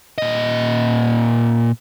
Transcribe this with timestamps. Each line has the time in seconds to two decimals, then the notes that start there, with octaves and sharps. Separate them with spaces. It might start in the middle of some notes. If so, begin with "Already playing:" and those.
0.18 A#2 D#5